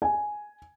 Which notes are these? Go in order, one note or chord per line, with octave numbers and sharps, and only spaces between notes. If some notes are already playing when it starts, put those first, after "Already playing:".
G#5